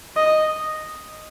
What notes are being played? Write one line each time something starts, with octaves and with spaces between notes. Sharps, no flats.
D#5